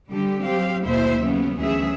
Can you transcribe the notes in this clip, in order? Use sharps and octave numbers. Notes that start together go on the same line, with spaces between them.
D3 G3 G4
F#3 C4 G4 F5
D#2 B2 A3 E4 C5 E5
C#3 F#3 B3 C#4
D2 E3 F#3 C#4 G#4 E5